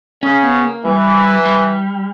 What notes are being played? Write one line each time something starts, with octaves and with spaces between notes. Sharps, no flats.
C#3 C#4
B3
A#3
E3 G3
F#3
G3